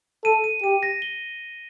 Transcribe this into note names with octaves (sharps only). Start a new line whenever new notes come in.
A4 D#7
D#7
G4 D#7
A#6
G7